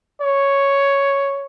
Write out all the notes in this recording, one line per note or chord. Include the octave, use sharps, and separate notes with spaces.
C#5